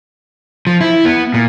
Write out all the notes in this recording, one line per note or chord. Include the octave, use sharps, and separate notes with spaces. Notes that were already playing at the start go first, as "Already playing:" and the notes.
F3
E4
B3
A#2